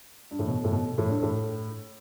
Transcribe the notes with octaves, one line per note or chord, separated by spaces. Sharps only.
G2
A2
B2
A2
B2
A2
G2
A2